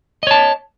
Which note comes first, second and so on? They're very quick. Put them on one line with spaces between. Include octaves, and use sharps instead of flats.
D#5 C#5 A5